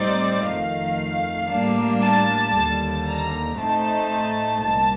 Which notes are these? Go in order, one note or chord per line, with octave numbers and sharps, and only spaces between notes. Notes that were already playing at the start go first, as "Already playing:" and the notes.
Already playing: A2 G3 C4 D#4 D5
F2 D#3 A3 F5
A2 G3 A#3 D4
A5
D#2 D3 G3
A#5
A2 A3 C4 D#4 A5
C2 A#2 A5